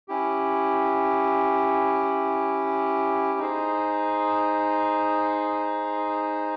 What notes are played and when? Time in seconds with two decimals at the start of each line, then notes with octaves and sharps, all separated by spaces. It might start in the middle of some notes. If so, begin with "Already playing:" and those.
0.08 C#4 E4 G4
3.39 D#4 G#4 C5